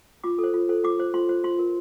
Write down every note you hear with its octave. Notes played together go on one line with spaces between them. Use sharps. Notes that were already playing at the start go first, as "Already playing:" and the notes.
F4 D6
A4
C5
F4
A4 C5
F4 D6
C5
F4 C6
C5
F4 C6
A#4